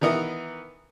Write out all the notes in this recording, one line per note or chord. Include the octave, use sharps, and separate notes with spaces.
D#3 E3 B3 A#4 E5 D#6